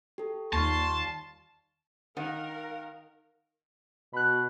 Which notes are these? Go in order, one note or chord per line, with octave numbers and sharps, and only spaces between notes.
G4 A4
D#2 G3 F4 A5 C6 C#6
D#3 A#4 F5 F#5
B2 B5 F#6